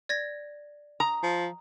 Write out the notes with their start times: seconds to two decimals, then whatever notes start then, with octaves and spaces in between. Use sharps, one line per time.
0.09 D5 G#6 A#6
1.00 A#5 D#6
1.23 F3